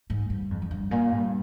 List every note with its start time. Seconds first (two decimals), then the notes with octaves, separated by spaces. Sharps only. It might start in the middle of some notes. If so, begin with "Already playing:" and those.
0.10 G#2
0.30 G2
0.51 F2
0.62 F2
0.71 G2
0.91 A#2
1.12 G2